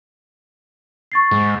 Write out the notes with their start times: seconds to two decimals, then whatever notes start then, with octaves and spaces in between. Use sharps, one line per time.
1.12 C#6 A6 C7
1.31 G#2